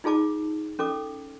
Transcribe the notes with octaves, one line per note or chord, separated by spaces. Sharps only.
D#4 F4 G#4 A5 D6
C#4 A4 D6